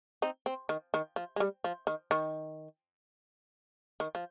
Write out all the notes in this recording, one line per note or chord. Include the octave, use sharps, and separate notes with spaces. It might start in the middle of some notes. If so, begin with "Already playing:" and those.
C4 D#4
C4
D#3
D#3
F3
G#3
G3
F3
D#3
D#3
D#3
F3